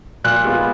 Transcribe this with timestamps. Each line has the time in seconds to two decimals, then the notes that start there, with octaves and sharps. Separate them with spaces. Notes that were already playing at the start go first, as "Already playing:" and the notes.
0.24 A#2 F#6
0.44 G#3 B3 F4